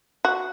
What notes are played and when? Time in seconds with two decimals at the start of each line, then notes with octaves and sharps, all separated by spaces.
0.25 F#4